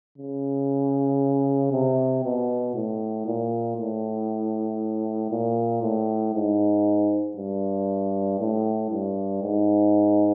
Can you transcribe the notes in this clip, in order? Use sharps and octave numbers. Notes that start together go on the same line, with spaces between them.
C#3
C3
B2
A2
A#2
A2
A#2
A2
G#2
G2
A2
G2
G#2